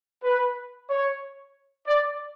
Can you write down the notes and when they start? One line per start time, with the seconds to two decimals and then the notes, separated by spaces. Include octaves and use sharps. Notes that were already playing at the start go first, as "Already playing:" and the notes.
0.24 B4
0.90 C#5
1.87 D5